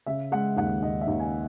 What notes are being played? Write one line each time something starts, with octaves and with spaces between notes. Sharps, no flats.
C#3 E5
G#3 F#5
D#2 F#5
D#2 D#5
E5
D#2
G#5